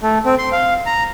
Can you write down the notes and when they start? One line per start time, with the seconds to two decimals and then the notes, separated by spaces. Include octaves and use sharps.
0.02 A3
0.26 C4
0.39 C6
0.52 F5
0.86 A#5